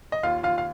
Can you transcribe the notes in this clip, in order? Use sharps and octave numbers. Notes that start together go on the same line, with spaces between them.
D#5
D#2 F4 F5
D#2 F4 F5
F5